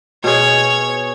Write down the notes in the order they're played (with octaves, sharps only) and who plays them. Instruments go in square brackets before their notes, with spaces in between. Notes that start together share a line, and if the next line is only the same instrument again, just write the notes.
[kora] B2 G#4 [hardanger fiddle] C#5